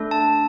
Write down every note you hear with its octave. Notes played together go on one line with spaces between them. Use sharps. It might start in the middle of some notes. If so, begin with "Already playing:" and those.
Already playing: A3 D4 A4
A5